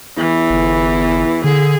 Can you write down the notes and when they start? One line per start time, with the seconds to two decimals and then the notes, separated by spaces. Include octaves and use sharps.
0.17 E2 E3
0.50 G1
1.44 D3 G#4